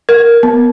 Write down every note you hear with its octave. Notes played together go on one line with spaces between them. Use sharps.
A#4
B3